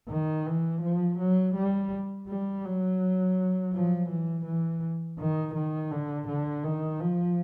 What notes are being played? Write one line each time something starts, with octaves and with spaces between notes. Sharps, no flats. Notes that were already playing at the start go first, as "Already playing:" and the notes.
D#3
E3
F3
F#3
G3
G3
F#3
F3
E3
E3
D#3
D#3
D3
D3
D#3
F3